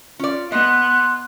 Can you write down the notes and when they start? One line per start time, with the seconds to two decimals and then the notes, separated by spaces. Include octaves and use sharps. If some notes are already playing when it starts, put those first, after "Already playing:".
0.19 C#4 F4 D5
0.52 B3 D#5 C6 F#6